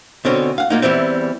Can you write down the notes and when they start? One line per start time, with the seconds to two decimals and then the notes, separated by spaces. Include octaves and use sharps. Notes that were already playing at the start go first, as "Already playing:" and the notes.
0.25 B2 D3 C4 C#4
0.58 F5 F#5
0.70 A#2 A#3 D#4
0.82 E2 D#3 E3 G3 C4